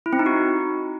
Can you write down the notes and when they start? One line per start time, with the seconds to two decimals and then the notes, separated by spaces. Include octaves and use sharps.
0.06 E4
0.13 C4
0.19 D#4
0.26 F#4